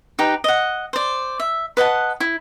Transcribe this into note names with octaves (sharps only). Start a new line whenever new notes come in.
D#4 G4 B4
D#5 F#5
C5 D5
E5
B4 D#5 F#5 A5
E4